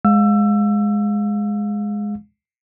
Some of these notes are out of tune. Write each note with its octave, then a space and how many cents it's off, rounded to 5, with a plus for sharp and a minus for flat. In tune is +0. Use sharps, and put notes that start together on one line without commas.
G#3 +0 F5 +20 E6 +20